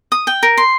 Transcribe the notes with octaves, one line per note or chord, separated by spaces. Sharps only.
D#6
G5
A#4
C6